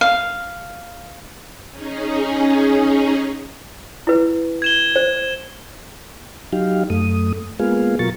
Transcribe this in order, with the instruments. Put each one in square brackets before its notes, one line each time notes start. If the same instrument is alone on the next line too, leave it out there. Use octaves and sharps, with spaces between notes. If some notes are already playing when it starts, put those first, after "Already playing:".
[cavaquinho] F5
[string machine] C#4 D#4 G#4
[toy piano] E4 B4
[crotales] G#6 E7 G7
[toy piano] C5
[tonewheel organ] F#3 D#4 G4 F5
F#2 A3 D#6
G#3 A#3 B3 F4 G#4 F5
B2 F#3 F4 A#4 C#6 A6